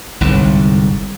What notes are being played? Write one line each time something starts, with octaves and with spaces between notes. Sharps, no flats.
G1 C2 G#2